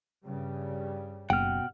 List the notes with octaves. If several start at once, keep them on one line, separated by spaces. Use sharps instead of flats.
G2 C#3 G3
F#1 B2 F#5 G5 F6